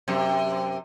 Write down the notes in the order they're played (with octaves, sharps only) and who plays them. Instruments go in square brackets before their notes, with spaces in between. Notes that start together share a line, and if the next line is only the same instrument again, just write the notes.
[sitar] F#2 C3